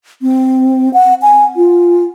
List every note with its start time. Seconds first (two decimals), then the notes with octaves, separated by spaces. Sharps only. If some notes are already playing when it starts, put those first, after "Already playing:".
0.22 C4
0.94 F#5
1.22 G#5
1.56 F4